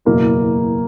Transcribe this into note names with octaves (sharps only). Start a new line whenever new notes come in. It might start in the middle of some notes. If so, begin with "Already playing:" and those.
F#1 E2 B2 A#3